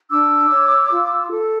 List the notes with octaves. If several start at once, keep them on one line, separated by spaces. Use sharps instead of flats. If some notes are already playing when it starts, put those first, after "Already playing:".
D4 D6 E6
C#5
F4
A4